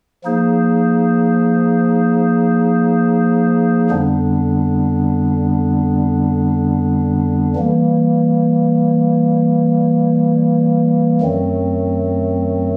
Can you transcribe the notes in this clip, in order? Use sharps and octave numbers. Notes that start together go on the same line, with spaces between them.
F3 A#3 D#4 G#4 C5
F2 D3 G3 B3 D4
E3 G3 A#3
F#2 D#3 F#3 A3 C4